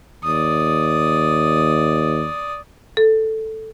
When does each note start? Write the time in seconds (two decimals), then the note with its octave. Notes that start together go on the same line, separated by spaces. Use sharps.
0.24 D#2 D5 D#6
2.97 A4